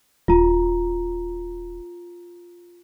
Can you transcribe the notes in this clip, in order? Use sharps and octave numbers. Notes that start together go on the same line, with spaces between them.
D#1 F4 A#5